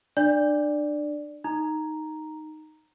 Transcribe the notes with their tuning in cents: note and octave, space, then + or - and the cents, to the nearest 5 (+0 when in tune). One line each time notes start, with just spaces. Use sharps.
D4 +30 D5 +0
D#4 +0 A#5 +0